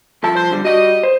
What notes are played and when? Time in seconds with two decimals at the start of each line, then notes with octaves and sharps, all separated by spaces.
0.23 C2 F3 E4 A4 A5
0.35 C5
0.51 D3 G3
0.65 G3 F#4 D#5
1.03 C5